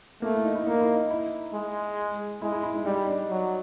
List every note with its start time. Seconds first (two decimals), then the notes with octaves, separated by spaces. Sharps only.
0.22 A3 A#3
0.33 E4
0.45 D#4
0.55 E4
0.66 A#3 D#4
0.81 E4
0.96 D#4
1.11 E4
1.54 G#3
2.41 G#3 E4
2.52 E4
2.63 E4
2.75 D#4
2.85 G3 D#4
3.07 D4
3.30 F#3